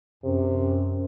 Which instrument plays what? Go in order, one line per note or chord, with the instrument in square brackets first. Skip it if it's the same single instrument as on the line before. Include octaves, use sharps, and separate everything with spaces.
[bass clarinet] F#2 [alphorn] C3